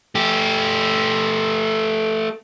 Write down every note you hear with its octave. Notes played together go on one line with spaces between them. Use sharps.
A3 G4